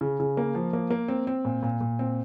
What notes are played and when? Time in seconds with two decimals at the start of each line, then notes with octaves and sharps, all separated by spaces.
0.01 C#3
0.20 C#3
0.37 A#3
0.55 F3
0.73 A#3
0.90 A#3
1.08 C4
1.27 C4
1.45 A#2
1.63 A#2
1.81 A#2
1.99 C4